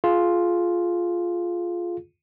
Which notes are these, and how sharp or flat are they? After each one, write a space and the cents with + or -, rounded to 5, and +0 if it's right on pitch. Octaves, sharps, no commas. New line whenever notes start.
F4 +0 G#4 +25